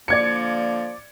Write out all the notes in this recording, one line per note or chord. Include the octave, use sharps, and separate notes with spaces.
D3 F3 A#3 D5 G#6 C#7